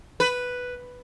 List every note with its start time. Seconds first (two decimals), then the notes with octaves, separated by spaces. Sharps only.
0.20 B4